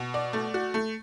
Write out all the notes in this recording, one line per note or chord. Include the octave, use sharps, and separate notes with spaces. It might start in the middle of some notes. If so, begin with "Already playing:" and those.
Already playing: B2
D5
A3
F#4
A3